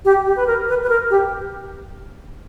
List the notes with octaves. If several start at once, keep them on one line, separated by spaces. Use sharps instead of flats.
G4
G4
B4
A#4
B4
B4
A#4
G4